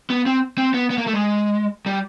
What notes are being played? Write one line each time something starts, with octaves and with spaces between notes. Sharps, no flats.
B3
C4
C4
B3
B3
A#3
A3
G#3
G3